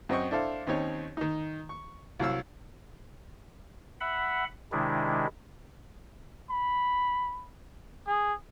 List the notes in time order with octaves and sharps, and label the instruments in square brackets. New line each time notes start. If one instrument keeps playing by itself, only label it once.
[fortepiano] F#2 C4 D#5 C#6
D4 E4 A4 C5 F5
D#2 C4 C#4 D#4 C#5
D#3 D#4
C#6
C2 F#3 F5 E6
[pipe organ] E5 F#5 B5
C3 D#3 G#3 D4 E4
[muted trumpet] B5
G#4